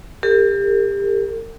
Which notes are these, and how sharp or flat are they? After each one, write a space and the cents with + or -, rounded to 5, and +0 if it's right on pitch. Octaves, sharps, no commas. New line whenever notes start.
G4 +30 A#4 -45